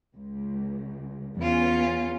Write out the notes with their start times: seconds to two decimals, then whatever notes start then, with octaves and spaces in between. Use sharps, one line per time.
0.16 C#2
1.37 E2 B3 C#4 F4